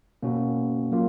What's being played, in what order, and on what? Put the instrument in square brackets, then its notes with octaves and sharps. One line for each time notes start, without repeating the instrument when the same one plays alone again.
[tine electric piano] B2 A#3 C#4 F#4
F#3 A#3 F4